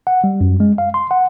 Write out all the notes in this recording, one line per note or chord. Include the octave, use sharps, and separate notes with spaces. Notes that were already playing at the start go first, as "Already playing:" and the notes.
F#5
G3
F#2
G#3
F5
C6
F#5